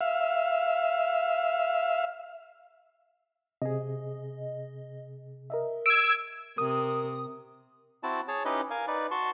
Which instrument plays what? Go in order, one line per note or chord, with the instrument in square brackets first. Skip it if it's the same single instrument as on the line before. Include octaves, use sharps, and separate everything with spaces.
[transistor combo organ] E5 F5
[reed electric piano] C3 G#4 [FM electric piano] D#5
[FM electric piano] A#4 D#5 E5
[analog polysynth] E6 G#6 [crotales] D7
[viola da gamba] C3 [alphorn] A#4 [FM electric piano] D#6
[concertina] C4 E4 F#4 A5
G#4 C#5 A5
C#4 D#4 E4 G4 B4 D#5
A#4 F5 G#5
D#4 B4 D5
F#4 A5 C6 C#6